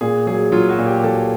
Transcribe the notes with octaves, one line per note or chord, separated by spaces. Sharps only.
A#2 G#4
F#3 G#4
F#3 F4
F#4
A#2
G4
F#3 A4